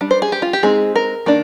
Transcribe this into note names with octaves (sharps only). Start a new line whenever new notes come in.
G3 D4
C5
G#4
G4
F4
G4
G#3 C4 D#4 G#4
A#4
D#3 A#3 D4